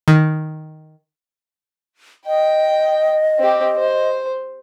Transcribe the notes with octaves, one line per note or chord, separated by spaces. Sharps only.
D#3
D#5 G5
C4 G4
C5